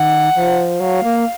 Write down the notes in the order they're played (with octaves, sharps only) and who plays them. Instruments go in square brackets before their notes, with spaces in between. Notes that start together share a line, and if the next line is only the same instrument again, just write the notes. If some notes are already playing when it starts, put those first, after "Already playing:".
Already playing: [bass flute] D#3 [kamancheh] F#5
[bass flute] F3
[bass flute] F#3 [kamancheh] F5
[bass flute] A#3